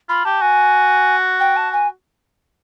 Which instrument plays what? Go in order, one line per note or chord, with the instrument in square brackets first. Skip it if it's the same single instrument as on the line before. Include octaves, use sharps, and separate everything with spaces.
[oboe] F4 [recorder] B5
[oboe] G4 [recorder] A5
[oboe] F#4 [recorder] G#5
[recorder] G5
A5
G#5